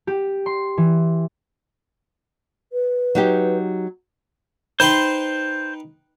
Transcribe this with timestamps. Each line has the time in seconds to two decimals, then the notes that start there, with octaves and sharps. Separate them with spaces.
0.07 G4
0.46 C6
0.77 E3
2.73 B4
3.15 F#3 D#4 G4
4.80 D#4 B4 C5 G5 C6